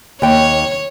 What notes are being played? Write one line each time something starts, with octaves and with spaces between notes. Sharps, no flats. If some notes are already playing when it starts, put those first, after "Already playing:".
D#2 C#5 G5